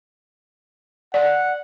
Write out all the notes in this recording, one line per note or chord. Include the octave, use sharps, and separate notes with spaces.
D5 F#5